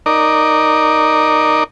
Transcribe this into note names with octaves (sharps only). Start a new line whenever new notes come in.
D#4 A#4 D5